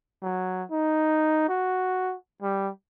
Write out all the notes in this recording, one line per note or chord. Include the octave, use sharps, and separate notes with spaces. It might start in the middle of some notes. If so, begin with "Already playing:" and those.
F#3
D#4
F#4
G3